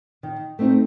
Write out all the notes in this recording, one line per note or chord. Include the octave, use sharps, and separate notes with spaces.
D#3
A3 C4 D#4